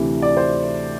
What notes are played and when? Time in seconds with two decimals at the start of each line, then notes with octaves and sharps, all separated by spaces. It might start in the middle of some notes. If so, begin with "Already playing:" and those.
Already playing: D2 C3 E3
0.22 D5
0.37 C5